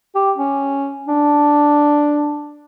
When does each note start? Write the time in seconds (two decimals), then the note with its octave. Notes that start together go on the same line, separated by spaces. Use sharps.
0.15 G4
0.38 C#4
1.08 D4